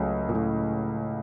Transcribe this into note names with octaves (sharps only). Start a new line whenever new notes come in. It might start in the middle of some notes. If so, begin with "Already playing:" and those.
Already playing: C#2 C#3 F#3 A3
A#2
A2